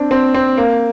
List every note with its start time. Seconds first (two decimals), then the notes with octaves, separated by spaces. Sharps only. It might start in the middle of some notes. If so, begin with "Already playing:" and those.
Already playing: C4 D4
0.11 C4
0.34 C4
0.57 A#3